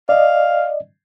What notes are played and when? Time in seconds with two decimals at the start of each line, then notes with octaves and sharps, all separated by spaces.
0.09 D5 D#5 F5